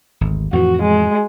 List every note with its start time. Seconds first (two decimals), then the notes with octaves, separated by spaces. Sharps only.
0.21 G#1 D2
0.53 F2 A2 E3 F#4
0.83 G#3